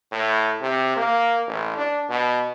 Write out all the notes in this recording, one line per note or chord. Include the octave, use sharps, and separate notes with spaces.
A2
C3
A#3
A1
D4
B2